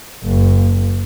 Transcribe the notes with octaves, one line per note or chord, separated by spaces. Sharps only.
F#1